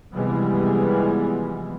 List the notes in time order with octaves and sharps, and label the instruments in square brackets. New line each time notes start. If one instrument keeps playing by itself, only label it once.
[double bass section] C3 E3 F3 G3 G#3 B3